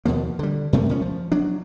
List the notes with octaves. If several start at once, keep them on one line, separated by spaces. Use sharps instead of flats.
D#2 B2 F3 A#3
D3 G3
F#2 C3 A3 A#3
C2 F3 C#4
F3
F#3 D4